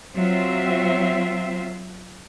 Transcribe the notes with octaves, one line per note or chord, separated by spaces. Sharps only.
F#3 C4 F4 E5